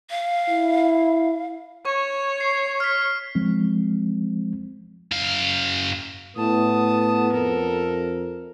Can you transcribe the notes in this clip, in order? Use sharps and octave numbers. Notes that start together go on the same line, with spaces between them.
F5
E4
C#5 C#6
C7
F6 B6
F3 G#3 C4
F#2 F5
A2 B3 A5 D#6
F2 A4 A#4